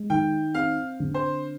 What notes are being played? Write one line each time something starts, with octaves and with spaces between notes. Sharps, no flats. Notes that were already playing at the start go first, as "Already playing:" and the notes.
Already playing: G#3
D#3 G5
C4 F5
D3
C5